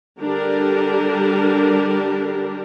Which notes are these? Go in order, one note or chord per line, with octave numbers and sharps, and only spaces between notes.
D3 G3 D4 G4 A#4